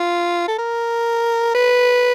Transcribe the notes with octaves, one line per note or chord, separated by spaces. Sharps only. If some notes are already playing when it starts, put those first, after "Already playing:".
Already playing: F4
A4
A#4
B4